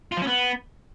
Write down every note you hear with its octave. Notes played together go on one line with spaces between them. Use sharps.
F4
F3
C#4
B3